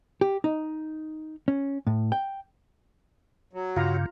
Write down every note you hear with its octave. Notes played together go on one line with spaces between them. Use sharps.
G4
D#4
C#4
A2
G5
F#3
G2 C#3 F4 F5 A#5